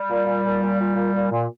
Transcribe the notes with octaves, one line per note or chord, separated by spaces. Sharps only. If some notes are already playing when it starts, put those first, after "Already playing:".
Already playing: G3
A#2
A#2
A#2
A#2
A#2
A#2
A#2
A#2